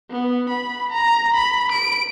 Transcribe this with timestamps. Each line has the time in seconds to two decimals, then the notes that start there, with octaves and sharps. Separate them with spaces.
0.11 B3
0.50 B5
0.92 A#5
1.34 B5
1.72 D7